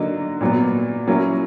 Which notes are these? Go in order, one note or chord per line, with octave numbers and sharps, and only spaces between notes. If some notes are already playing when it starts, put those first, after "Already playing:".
Already playing: D3 F#3 A#3 D#4
A#2 F#3 B3
F#3 A#3 C#4 E4